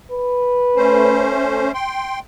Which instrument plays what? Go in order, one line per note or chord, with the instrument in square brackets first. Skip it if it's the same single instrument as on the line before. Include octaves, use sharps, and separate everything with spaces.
[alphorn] B4
[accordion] A3 C#4 C5
G5 C6